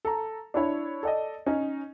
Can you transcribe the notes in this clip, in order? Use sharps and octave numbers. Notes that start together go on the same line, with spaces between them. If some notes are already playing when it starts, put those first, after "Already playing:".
A4 A#5
D4 E4 C#5
A4 D5 D#5
C#4 D#4